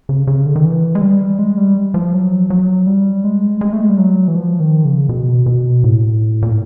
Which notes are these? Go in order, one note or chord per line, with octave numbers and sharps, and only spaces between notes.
C#3
C#3
D3
D#3
E3
G#3
G3
G#3
G3
F3
F#3
F#3
G3
G#3
G#3
A3
G#3
G3
F#3
E3
F3
D#3
C#3
B2
B2
A2
A#2
A2